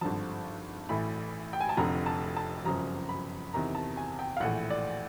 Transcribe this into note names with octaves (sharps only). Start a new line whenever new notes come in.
G#1 G2 D3 F3 A5
A1 A2 E3 B5
G5
G#5
A5
F1 F2 D3 A#5
A5
A5
G1 F#2 C#3 F3 A#5
B5
E2 C3 D#3 A#5
A5
G#5
G5
F5
A#1 A2 E3 F#5
D5